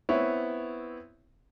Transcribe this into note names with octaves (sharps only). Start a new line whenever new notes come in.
B3 C4 E4 C#5